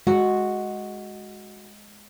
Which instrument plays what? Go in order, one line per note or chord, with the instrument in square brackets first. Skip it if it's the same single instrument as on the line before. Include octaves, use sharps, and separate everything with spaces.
[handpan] G#3 [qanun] F#4